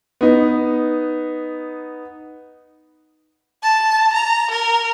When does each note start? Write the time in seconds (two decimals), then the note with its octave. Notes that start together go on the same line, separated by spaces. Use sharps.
0.21 B3 D#4
3.63 A5
4.13 A#5
4.50 A#4